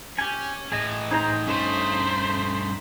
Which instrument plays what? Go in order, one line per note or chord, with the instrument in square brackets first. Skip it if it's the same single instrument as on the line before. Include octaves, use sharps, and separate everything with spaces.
[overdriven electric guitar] C#4 [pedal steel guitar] G4 G#5
[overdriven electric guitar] A2 E3 [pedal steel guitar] G#4 D#5
[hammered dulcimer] D#4 [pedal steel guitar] G#4 C5 A#5
[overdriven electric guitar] G2 A3 [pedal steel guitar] C#4 [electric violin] C5 B5